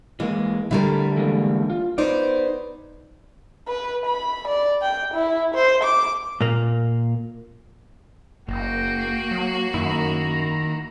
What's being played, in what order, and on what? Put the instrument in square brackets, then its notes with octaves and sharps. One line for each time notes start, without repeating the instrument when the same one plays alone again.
[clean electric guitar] E3 A#3 [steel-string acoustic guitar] G#3
[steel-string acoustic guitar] D3 G3 A3 [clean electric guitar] E4 A#4
[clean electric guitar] E3 G#3 A#3
F4
[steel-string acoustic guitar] B3 D#4 C5 [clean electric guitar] B4 D5
[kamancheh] B4
B5
D5
G5
E4
C5
D6
[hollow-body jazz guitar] A#2 A#3
[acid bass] F#1 [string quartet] A#3 F#4 [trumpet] G5
[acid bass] F#3
[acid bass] F#2 [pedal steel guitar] D#3 E4 [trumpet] A#5